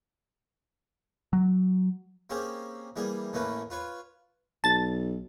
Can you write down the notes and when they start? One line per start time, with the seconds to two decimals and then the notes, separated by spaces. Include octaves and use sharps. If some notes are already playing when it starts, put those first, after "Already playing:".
1.33 F#3
2.30 A#3 C4 C#4 G4 G#4
2.96 E3 G3 A#3 G#4
3.33 A1 E3 A3 A#3 C#4 B4
3.70 F4 B4 C#5
4.64 B1 A5 A6